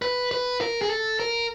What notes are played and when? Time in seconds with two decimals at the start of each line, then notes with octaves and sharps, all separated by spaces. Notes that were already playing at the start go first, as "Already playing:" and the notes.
0.02 B4
0.31 B4
0.61 A#4
0.82 G#4
0.90 A4
1.20 A#4